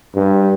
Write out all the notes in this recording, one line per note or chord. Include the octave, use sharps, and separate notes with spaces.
G2